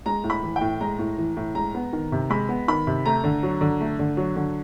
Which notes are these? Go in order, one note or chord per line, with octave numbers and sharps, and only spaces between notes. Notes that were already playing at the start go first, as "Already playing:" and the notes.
G#3 A#5
A2
B5
E3
G5
A2
G#3 A#5
A2
E3
A2
G#3 A#5
B3
D#3
C3
G#3 B5
B3
D#3 B5
C3
A3 A#5
D3
F#3
D3
A3
D3
F#3
D3